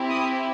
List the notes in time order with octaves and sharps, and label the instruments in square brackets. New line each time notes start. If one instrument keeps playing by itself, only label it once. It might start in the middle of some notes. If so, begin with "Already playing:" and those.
Already playing: [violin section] C4 E4 G4
D#6